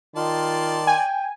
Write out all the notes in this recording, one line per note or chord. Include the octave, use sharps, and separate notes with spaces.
D#3 F4 D5 A5 C6
G5 G#5